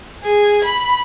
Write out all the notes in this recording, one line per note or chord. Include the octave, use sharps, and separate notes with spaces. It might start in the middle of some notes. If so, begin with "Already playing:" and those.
G#4
B5